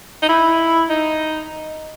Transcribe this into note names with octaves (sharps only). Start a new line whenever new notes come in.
D#4
E4
D#4